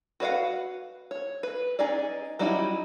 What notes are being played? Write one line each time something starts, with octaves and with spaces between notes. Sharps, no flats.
F#4 B4 C#5 F5 F#5
C#5
B4
C#4 D#4 G#4 D5
F#3 G3 C#4 D#4 E4